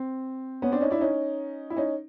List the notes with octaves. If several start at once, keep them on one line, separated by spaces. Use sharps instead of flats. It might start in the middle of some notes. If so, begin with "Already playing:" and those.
Already playing: C4
B3 C#4
C4 D4
C#4 D#4
D4 E4
C#4 D#4
E4
C#4 D#4